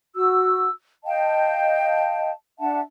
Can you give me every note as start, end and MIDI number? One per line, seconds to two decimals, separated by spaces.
0.15 0.69 66
0.15 0.69 88
1.05 2.30 75
1.05 2.30 77
1.05 2.30 79
1.05 2.30 81
2.59 2.79 62
2.59 2.79 76
2.59 2.79 78
2.59 2.79 81